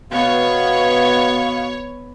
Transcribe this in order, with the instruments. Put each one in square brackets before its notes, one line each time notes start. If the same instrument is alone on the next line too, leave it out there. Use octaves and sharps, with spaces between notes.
[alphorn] B2 [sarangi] B3 [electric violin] C#5 C#6 [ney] F5